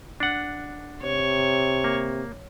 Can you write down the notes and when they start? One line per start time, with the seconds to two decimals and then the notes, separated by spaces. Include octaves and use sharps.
0.20 D4 F#5
1.03 C3 C#5
1.84 A#3